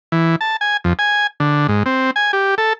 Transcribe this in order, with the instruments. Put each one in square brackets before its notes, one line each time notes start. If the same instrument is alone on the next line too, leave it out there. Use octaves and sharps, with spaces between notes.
[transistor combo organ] E3
A5
G#5
F2
G#5
D3
G#2
C4
G#5
G4
A4